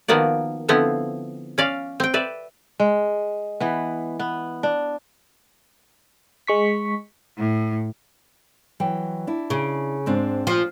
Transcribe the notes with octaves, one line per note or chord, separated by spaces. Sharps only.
D#3 F3 A#3 B3 F#4 D5
D3 F3 B3 C4 E4
C#4 D5 F5
C4 G5
B4 D5 E5
G#3
E3 B3
B3
D4
G#3 C#6 B6
A2
E3 F#3 G5
D4 E4
C#3
G#2 C4 D4
A#2 F3